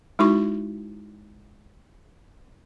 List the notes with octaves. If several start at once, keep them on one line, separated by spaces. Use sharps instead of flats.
G#3 D#4 E4 F#4 C#6